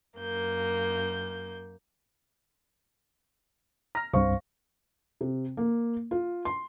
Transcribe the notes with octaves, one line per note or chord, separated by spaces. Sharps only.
F#2 A#3 G6
A#5 F6 A#6
C2 G2 C3 C5 F5 C#6
C3
A#3
F4
C6